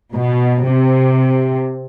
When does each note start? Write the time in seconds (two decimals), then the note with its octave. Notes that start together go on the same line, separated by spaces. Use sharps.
0.14 B2
0.66 C3